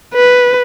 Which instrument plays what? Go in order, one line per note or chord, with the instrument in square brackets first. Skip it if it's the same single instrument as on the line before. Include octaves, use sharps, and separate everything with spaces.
[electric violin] B4